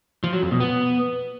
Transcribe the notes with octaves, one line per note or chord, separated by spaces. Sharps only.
F3
F#3
F2
B2
B3